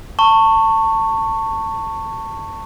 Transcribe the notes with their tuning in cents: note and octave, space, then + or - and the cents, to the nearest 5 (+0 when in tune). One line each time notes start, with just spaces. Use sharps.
A5 +25 C#6 -5